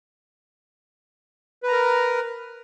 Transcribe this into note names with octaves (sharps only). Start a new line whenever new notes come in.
A#4 B4 A#5